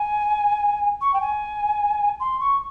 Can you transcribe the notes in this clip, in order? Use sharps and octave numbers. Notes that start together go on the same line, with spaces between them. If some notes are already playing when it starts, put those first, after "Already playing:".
Already playing: G#5
C#6
G5
G#5
C6
C#6